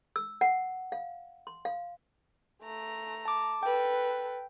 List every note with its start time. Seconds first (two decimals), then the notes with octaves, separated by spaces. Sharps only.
0.16 E6
0.41 F#5
0.92 F5
1.47 C6
1.65 F5
2.63 A3 A#5
3.25 A5 D6
3.63 A4 B4 G5